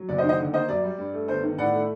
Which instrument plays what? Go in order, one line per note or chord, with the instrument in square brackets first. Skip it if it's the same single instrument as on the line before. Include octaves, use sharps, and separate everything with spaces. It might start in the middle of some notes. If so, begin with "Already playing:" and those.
Already playing: [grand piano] F#3
F#1 D5
C5 D#5
D#3
C5 D#5
D3
A#3 C5 D#5
F#2 D5
G3
G2
A3
G1 C5
D#3
A2 D5 F#5
A3